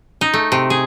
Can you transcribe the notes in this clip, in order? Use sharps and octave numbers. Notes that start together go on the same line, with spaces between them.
D#4
A3
C3
G#4